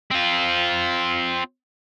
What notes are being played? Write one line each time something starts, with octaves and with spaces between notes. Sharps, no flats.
C4 F4